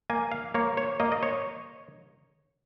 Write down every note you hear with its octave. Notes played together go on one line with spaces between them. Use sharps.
A#3 G#5
F5
A#3 C#5
C#5
A#3 D#5
D#5
C#5